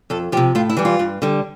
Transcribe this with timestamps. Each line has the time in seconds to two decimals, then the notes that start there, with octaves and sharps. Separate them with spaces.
0.10 F2 A4
0.32 F3 G4
0.37 C3
0.55 A2 F4
0.70 E4
0.77 E3 G3
0.85 F4
0.99 G2
1.22 D3 G3